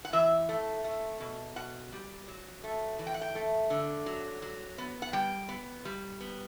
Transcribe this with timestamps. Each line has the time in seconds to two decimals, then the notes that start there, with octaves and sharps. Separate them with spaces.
0.05 F#5
0.13 E3 E5
0.49 A3
0.84 A3
1.20 B2
1.56 B2 F#5
1.92 G3
2.28 F#3
2.64 A3
2.99 E3
3.07 G5
3.14 F#5
3.21 G5
3.35 A3
3.70 D3
4.06 F#3
4.42 F#3
4.78 B3
5.02 F#5
5.13 G3 G5
5.49 B3
5.85 G3
6.20 B3